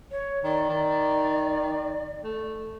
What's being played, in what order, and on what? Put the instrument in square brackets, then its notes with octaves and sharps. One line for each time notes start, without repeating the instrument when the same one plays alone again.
[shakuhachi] C#5
[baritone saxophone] D#3 [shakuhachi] D5
[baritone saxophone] D#3
A3